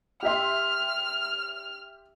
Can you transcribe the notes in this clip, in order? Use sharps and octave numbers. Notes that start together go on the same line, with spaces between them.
G4 E5 C6 F6